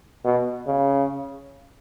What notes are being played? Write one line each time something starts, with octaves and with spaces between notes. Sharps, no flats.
B2
C#3